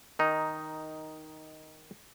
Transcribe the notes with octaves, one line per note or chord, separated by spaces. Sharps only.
D#3 D#4